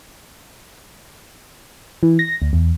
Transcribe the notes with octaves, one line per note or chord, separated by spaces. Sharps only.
E3
A#6
D2
E2